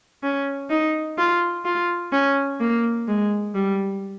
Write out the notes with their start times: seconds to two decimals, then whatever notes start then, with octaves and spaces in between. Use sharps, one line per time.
0.23 C#4
0.70 D#4
1.18 F4
1.65 F4
2.12 C#4
2.60 A#3
3.08 G#3
3.55 G3